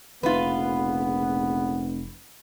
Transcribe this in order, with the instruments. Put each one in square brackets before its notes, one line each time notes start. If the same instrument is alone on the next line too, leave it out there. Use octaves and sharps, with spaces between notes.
[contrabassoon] F1 [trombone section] A#1 C#3 B3 [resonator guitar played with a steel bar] F4 B4